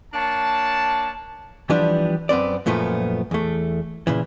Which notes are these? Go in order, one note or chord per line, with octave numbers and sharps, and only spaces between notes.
A#3 D4 C#5 A5
E3 F3 G3 B3 D4
F#2 B3 C4 D5
F#2 A#2 F3 A3 B3
E2 A3
A#2 C#3 E3